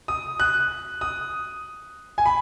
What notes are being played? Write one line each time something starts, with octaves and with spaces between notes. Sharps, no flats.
D#6
F#6
D#6
G#5
B5